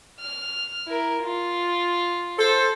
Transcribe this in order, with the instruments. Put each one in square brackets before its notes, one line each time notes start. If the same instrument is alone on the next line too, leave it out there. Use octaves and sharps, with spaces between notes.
[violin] F6
E4 A#4
F4
[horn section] A4 C5